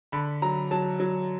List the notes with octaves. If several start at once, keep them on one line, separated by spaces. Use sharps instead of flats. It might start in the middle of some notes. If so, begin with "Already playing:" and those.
D3 B5
F#3 A#5
F#3 A5
F#3